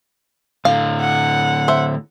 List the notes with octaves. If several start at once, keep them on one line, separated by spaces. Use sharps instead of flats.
A2 D3 F5
F#5
C5 E5